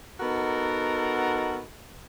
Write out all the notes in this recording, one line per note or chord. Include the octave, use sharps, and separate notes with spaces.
B3 D#4 F#4 A4 A#4